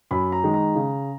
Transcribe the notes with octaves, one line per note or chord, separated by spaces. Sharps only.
F#2 B5
A#5
D#3 G#3 D#4
A#5
C#3